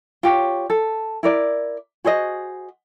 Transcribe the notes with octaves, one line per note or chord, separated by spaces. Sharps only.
F4 G4 C#5
A4
E4 A#4 D5
F#4 G#4 C5 D#5